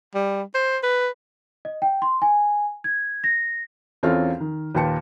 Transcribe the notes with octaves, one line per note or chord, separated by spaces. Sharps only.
G3
C5
B4
D#5
G5
C6
G#5
G#6
A#6
E2 C4 C#4 F4 A4 F6
D#3
D#2 A#2 B4 G5 A5 C#7